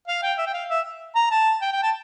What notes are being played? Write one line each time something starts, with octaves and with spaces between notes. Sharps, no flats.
F5
G5
E5
G5
F5
E5
A#5
A5
G5
G5
A5